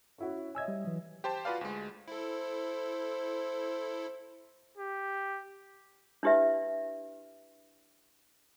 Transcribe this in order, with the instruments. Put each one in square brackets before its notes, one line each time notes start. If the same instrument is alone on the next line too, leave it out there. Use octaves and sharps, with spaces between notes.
[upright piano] C#4 E4 F#4
[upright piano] C#5 D#5 E5 [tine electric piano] G#5 E6 G#6
[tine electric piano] G3
E3 F#3
[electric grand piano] G4 C5 A5
F4 F#4 B4 D5 F5
D2 G#3
[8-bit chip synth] E4 A4 [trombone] C5
[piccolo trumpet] G4
[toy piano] D4 E4 G4 B4 E5